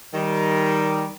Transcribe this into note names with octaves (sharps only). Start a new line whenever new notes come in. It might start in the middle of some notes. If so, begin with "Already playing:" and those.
D#3 G3